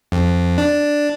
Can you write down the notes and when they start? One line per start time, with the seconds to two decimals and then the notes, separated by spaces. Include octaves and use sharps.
0.12 F2
0.58 D4